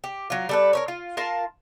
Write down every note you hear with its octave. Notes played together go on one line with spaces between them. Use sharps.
G4
F#3 F4
G3 A4 B4
A#4 B4 C#5
F4
F4 A#4 F5 A5